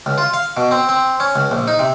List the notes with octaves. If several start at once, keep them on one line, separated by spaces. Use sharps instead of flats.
C#2
F4
F5
B2
C4
C4
C#4
C#2
A#1
D#4
C3